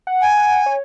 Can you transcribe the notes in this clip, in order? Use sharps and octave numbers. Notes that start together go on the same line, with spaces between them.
F#5
G#5
C#5